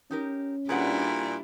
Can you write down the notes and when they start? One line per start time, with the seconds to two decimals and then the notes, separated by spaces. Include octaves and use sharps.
0.11 C#4 D#4 G4 A#4
0.69 A#2 G3 D4 E4 G#4 B4 F#5